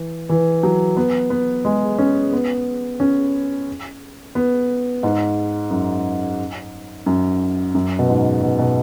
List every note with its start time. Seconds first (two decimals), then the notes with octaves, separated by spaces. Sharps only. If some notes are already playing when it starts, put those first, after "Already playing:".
Already playing: E3
0.29 E3
0.63 F#3
0.97 B3
1.30 B3
1.65 G#3
1.98 C#4
2.33 B3
3.00 C#4
4.35 B3
5.03 G#2
5.71 F#2
7.06 F#2
7.75 F#2
7.99 B2
8.09 G#2
8.42 B2
8.59 B2